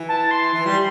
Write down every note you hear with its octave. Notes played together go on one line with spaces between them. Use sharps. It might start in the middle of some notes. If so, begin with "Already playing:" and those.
Already playing: E3
A5
C6
E3
G3